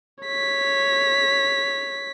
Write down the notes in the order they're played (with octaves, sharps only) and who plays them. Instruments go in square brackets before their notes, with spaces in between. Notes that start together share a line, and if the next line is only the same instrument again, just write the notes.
[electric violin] C#5 B6